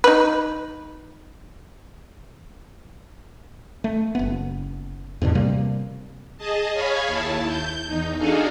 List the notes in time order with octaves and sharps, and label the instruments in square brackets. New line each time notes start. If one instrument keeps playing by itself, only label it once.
[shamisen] D#4 B4
[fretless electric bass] A3
F#1 B3
E2 G#2 B2 D3
C3 G3 A#3
[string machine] G#4 D#5 A5
G#4 C#5 F5 G#5 B5
D#2 E4 A5
G6
E2 D#4
D4 D#4 F#4 G#4 A4 F5